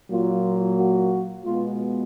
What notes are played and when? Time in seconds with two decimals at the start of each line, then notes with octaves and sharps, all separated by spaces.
0.11 A#2 F#3 A#3 F4
0.78 F#4
1.45 B2 G#3 B3 F4